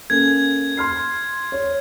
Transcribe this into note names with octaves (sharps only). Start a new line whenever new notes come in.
A#3 C#4 A4 G#6
C6 F6 C7
C#5